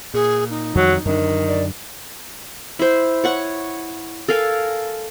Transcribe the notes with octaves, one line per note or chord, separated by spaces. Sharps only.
A#2 G#4
D#4
F2 D#3 F#3 G3
F#2 D3 D#3 D4
D5
E4 C5
C#5 F#5 C#6
A4 A#4 F5 G#5